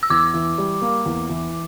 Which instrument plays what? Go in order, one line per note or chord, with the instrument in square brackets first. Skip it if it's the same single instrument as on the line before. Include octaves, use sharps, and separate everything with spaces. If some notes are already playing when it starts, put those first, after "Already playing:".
[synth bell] E6
[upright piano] E2 [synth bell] D6
[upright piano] E3
G3
A#3
E2
E3